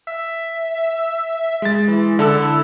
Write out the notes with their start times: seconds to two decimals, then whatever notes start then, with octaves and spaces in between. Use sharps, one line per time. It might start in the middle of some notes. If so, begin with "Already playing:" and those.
0.07 E5
1.62 G#3 A6
1.88 E3
2.19 D3 E4 A4 E6